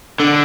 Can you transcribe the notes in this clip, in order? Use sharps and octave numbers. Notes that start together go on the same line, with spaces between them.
D3